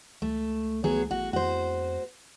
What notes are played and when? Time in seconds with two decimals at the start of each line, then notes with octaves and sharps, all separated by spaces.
0.22 C#2 A3
0.84 F#3 B3 G#4
1.11 A1 F#4
1.33 F2 F#4 C5